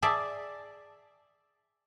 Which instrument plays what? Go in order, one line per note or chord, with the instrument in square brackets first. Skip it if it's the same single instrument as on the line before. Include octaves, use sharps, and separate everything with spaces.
[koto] G#4 D5 E5 A5